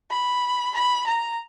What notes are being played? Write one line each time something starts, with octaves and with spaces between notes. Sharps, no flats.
B5
B5
A#5